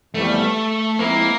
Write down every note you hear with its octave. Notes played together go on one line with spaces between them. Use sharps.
F2 C#3 E3 G3 A3 B3
F3 G#3 A#3 C4 E4